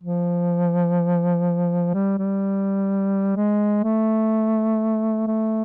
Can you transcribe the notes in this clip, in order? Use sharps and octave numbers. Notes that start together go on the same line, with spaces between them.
F3
G3
G3
G#3
A3
A3